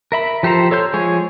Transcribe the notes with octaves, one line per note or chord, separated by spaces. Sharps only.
A#4 E5 B5
F3 G4 A4 C5 A#5
A4 C#5 C6 G6
F3 G#3 G#4 C#5